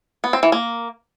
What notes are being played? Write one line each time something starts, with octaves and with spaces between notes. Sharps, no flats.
B3
C4
E3
A#3